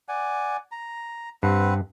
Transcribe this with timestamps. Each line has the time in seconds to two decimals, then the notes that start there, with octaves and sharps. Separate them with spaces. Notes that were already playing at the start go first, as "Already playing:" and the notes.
0.09 D5 F#5 G#5
0.72 A#5
1.43 G2 C4 B4 F#5